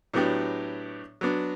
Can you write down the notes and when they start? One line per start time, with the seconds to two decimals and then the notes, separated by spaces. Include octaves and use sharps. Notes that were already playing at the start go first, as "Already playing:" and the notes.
0.13 A2 F#3 B3 D4 G4
1.21 F#3 B3 D4